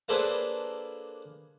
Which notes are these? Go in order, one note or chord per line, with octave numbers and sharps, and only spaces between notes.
A#3 D4 G#4 A4 B4 C5